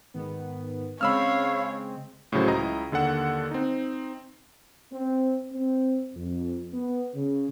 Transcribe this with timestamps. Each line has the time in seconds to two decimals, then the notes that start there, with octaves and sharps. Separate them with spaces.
0.14 G#2 D#3 B3
1.01 C#3 G#3 C4 C#5 F5 B5 E6 F6
2.32 A2 C#3 F#3 C5
2.47 C#2 E4 D#5 A#5
2.92 D#2 D3 A4 F#5 E6
3.51 C4 D#4
4.92 C4
5.52 C4
6.16 F2
6.73 B3
7.14 C#3